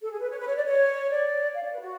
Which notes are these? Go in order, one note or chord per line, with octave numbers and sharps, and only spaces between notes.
A4
G#4
B4
C#5
B4
C#5
D5
C#5
D5
F5
D5
B4
F#4